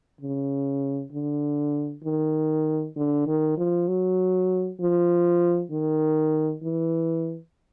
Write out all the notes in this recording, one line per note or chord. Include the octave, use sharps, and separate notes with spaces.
C#3
D3
D#3
D3
D#3
F3
F#3
F3
D#3
E3